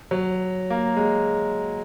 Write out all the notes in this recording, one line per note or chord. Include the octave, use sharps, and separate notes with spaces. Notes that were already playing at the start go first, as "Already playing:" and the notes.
F#3
A#3
G#3